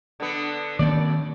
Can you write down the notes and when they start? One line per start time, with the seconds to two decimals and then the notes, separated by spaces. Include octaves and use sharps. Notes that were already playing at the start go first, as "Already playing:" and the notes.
0.20 D3 B3
0.79 F#2 D#3 A#3 C4 D5